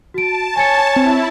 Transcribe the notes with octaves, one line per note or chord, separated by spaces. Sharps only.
F#4 A5 D7
C#5 G#5 A6 C#7
C4 E4